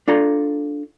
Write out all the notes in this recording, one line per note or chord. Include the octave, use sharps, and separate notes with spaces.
D4 F4 A4 A#5